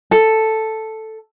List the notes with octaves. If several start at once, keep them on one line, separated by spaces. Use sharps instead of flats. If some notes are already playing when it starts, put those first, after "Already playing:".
A4